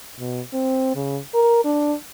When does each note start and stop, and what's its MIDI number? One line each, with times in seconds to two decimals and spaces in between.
0.19 0.41 47
0.53 0.94 60
0.96 1.19 49
1.34 1.62 70
1.65 1.94 62